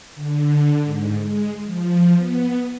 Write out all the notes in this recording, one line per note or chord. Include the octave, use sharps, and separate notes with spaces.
D3
G#2
G#3
F3
B3